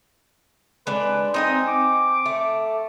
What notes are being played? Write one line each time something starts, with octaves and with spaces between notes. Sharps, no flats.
G#3 D4 B4
C4 D#4 D#5 G#5
D6
A3